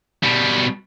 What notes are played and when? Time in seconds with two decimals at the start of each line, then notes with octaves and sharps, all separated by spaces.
0.23 B2 G3